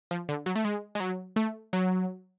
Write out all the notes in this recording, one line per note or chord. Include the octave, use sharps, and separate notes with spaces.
F3
D3
F#3
A3
G#3
G#3
F#3
A3
F#3